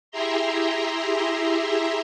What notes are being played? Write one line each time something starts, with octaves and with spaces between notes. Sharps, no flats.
E4 G4 G#4 E5 A#5 C6